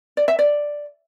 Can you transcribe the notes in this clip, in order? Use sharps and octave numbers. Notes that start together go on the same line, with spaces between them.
D5
E5
D5